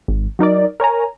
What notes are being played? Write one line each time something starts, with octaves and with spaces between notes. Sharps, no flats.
G#1
F#3 D#4 A#4 D5
A#4 C#5 G#5 A#5